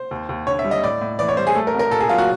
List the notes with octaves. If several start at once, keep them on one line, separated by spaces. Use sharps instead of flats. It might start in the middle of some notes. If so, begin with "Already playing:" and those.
Already playing: C5
D#2
D#2
D3 C#5
E5
G3
D#5
A2 D5
A2
E3 D5
C#5
G3 C5
G#4
A3 A4
A#4
C2
A#4
A#2 A4
G#4
F#3 F4
F#4